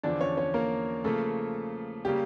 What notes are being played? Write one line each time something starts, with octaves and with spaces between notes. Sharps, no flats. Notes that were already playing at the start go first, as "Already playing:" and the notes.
E2 D3 F3 D4 D5
C#4 C#5
C#4 C#5
A#3 A#4
C#3 F3 A3 A#3 A4
C#3 G3 A#3 G4